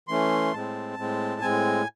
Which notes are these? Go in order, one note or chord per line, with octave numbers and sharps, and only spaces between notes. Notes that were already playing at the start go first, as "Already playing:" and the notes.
E3 A3 C#4 C6
A2 G#3 C4 A5
A2 G#3 C4
A2 G#3 C4 G#5